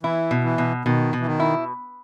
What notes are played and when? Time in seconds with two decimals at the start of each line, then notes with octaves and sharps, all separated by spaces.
0.03 E3 E4
0.31 B2
0.44 E3
0.58 B2
0.85 B2 D#3
1.13 B2
1.20 E3
1.26 D#3
1.40 E4